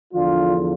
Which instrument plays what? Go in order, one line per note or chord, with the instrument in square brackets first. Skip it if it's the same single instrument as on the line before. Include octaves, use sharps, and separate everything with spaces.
[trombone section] E2 D3 F3 D4 F4